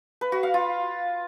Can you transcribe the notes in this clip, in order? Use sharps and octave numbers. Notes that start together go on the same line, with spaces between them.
B4
F#4
F5
F4